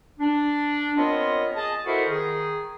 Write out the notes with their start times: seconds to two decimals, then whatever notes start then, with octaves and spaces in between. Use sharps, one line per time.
0.20 D4
0.97 B3 C4 F4 A#4 C#5 D#5
1.55 G#4 D#5 A5
1.85 E4 F#4 A4 A#4 C5 D#5
2.08 D#3 G#4